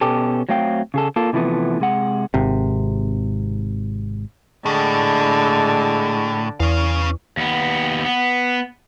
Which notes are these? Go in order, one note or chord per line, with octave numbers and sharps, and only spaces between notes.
B2 B3 C#4 G4 A4
F#3 A3 C4 F5 G5
C#3 G#4 A4
A#3 F4 A4
C3 E3 F3 A3 B3
C3 G#3 F#5
G#1 C3
A2 D3 G#3
E2 C#4 F5
D#2 B3
B3